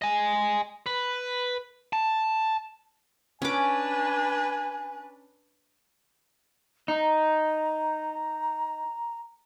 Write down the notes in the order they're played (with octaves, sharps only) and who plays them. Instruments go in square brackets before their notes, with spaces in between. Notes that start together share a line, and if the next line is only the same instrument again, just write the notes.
[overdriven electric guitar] D#5 G#5
B4
A5
[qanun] C#4 D6 [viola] D4 B4 [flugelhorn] G#5
[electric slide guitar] D#4 [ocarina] A#5